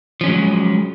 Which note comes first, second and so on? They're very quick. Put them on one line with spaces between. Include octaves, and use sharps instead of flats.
F3 C#4 F#3 G#3